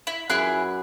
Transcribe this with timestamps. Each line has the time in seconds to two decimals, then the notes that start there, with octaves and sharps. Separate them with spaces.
0.07 E4
0.30 F#2 E4 G#4 B4 F#6